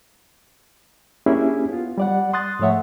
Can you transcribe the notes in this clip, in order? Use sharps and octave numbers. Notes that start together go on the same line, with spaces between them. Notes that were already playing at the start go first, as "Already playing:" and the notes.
A#3 C#4 D4 E4 G4 G#4
B3 F4
G3 D5 F#5
C6 D#6 F#6 A6
G#2 F3 A3 C#5 E5 F#5